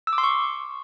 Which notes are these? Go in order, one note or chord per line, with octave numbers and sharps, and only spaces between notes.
E6
D6
C6
C#6